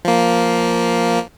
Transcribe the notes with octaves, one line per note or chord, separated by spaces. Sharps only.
F3 A#3